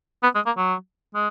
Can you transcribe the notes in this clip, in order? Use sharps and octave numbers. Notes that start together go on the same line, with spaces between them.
B3
G#3
A#3
F#3
G#3